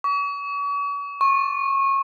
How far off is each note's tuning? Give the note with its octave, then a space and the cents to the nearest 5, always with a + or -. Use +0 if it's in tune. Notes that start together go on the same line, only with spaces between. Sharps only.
C#6 +40
C#6 -25